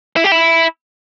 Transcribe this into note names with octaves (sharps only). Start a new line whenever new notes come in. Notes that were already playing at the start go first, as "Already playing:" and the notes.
E4
G4
E4